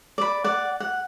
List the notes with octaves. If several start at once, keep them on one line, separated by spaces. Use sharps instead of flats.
D5 B5
D5 F#5
F#5